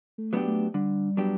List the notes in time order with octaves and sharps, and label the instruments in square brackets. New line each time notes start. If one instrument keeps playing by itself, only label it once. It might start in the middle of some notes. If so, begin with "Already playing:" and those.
[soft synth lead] A3
[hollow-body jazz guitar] F#3 B3 D4 G4
[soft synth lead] A3
[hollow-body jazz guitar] D3 [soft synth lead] G3
[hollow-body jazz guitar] F#3 B3 D4 G4